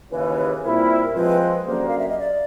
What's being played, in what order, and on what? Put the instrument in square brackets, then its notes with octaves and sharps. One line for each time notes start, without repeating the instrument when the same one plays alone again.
[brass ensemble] D#2 C#3 E3 [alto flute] B4
[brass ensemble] A#2 G3 C4 E4 [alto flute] A#4
[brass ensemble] F3 G#3 C4 [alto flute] B4
[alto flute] B4
[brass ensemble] F#2 D3 G3 A#3 [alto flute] C5
[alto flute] F5
E5
D#5
D5